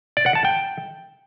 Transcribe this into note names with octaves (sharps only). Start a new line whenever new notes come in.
D5
F#5
A5
G5